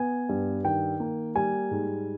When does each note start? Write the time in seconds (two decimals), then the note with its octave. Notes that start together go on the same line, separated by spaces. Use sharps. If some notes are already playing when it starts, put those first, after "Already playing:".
Already playing: B3 G#5
0.29 G2
0.64 D#3 G5
1.00 A#3
1.35 G3 G#5
1.71 G#2